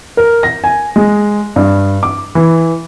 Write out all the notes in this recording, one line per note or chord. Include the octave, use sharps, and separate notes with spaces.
A#4
A#6
G#5
G#3
G2
D6
E3